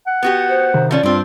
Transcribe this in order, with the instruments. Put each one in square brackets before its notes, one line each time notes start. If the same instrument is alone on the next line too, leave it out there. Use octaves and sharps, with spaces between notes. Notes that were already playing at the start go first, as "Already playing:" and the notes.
[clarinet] F#5
[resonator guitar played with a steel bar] B3 F#4 G4
[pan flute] C5
[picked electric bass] C3 D#3
[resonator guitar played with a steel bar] F3 C#4 [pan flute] D5
[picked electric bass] G2 [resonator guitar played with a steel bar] C4 D4 [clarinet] F4